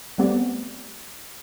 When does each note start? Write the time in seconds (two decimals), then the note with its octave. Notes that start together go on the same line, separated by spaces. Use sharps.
0.18 G3 A3 B3 C4 G4 D5